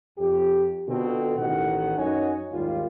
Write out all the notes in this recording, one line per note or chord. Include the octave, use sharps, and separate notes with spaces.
F2 G4
B2 D3 C4 F4 A4
A1 D#3 F#5
F#2 D#4 F#4 C#5 D#5 G#5
G#1 D#2 G3 F4